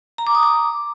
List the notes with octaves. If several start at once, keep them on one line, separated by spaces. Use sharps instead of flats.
A#5
D6
D#6
D6